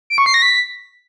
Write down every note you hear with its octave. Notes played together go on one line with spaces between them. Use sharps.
D7
C#6
C7
A#6
B6